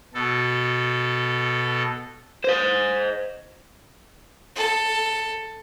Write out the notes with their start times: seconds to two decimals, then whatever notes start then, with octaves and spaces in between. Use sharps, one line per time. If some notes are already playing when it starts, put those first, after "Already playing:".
0.14 B2 A4
2.44 C5 D#5
4.56 A4